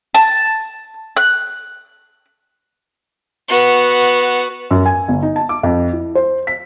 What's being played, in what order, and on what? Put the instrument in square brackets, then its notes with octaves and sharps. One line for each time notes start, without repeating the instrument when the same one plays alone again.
[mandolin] A5
F#6
[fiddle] B3 F#4
[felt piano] F#2
G#5
G1
D#4
A5
D6
F2
E4
C5
B6